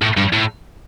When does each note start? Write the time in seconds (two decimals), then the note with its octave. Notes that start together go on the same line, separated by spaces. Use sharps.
0.02 A2
0.17 G2
0.33 A2